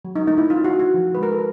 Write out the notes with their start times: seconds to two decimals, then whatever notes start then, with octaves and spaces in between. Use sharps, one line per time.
0.05 F#3
0.16 D#4
0.27 A3 D#4
0.38 E4
0.50 C#4 F4
0.64 F#4
0.72 A3
0.79 F#4
0.94 F3
1.15 G#3 B4
1.23 A#4
1.32 A4